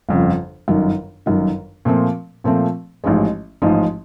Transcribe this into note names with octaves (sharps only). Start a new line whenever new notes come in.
G1 F2 C#3
G1 F#2 D#3
G1 F#2 D#3
A#2 F3 A3 C4
A#2 F3 A3 C4
A1 G#2 F3 G#3
A1 G#2 F3 G#3